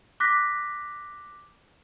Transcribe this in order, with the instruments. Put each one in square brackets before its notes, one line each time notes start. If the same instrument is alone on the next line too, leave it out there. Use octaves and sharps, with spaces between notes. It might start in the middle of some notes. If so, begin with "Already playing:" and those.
[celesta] D6 F#6 A#6 B6